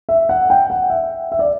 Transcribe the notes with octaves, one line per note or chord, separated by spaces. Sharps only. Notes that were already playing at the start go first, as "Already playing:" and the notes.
E5
F#5
G5
F#5
E5
E5
D5